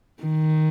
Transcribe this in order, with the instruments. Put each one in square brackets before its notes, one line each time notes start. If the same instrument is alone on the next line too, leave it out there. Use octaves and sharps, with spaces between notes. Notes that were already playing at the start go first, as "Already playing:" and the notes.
[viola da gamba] D#3